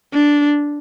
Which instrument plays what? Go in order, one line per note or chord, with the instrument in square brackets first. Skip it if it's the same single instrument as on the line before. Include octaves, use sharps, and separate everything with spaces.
[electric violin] D4